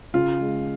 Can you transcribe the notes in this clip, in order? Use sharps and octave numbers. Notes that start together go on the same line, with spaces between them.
C#3 F4
G#3